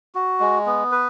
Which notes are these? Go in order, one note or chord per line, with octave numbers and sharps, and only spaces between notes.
F#4
G#3
B3
B4